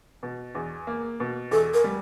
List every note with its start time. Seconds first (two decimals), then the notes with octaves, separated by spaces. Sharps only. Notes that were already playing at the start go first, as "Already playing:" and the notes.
0.23 B2
0.55 E2
0.87 A#3
1.20 B2
1.51 E2 A4
1.74 A#4
1.84 G3